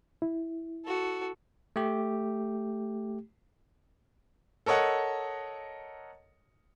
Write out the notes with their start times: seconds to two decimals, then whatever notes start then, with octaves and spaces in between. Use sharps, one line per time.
0.22 E4
0.85 F#4 A4
1.76 A3 G4
4.66 A4 A#4 C#5 D#5 F#5